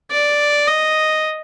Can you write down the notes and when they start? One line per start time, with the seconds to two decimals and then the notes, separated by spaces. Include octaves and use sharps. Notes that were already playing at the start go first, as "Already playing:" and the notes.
0.11 D5
0.67 D#5